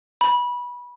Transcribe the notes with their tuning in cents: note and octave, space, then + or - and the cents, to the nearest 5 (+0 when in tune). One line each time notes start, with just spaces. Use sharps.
B5 -20